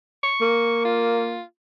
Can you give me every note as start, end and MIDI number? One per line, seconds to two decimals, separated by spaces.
0.23 0.83 85
0.41 1.42 58
0.85 1.43 65